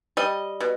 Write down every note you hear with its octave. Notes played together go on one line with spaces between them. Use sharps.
G3 D#5
B2